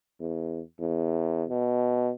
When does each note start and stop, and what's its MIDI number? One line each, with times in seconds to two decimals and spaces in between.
0.21 0.60 40
0.81 1.44 40
1.49 2.11 47